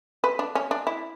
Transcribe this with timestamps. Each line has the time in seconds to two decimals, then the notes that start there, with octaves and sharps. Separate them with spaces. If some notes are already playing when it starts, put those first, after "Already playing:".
0.24 B4
0.39 D4
0.55 C#4
0.71 D4
0.87 E4